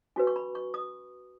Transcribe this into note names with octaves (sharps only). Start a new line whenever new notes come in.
C#4 F#4 B4 G#5
C#6
B5
C#6
D#6